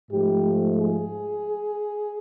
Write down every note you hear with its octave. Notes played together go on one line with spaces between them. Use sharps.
G#2 F3 A3 G4
G#4